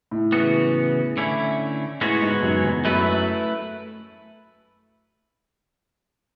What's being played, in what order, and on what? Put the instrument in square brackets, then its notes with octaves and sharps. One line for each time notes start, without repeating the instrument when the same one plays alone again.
[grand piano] A2
[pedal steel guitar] C#3 E3 B3 F#4
D3 A3 C#4 E4
[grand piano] A2 [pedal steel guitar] G#3 B3 F#4 C#5
[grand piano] G#2
F#2
E2
[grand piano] F#2 [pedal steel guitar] A3 E4 B4